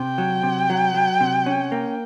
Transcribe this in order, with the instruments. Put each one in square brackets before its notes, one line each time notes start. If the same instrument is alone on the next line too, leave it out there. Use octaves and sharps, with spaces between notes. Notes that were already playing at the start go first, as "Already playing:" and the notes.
Already playing: [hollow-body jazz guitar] C3 [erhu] G5
[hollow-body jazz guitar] F#3
C3
F#3
F#3
C3
C#4
A#3